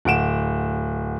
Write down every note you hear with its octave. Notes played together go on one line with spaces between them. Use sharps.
D1 F#5 D7 E7